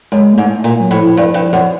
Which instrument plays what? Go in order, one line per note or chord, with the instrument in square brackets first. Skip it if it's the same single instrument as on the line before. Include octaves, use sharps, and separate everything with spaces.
[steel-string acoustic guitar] F#2 [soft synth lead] G#3
[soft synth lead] A#3
[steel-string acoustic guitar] G#2 [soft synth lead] A3
[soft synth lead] A3
[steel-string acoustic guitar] A#2 [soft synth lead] A#3
[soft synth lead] F#3
[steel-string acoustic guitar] A2 [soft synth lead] F3
[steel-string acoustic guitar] G2
G2
F#2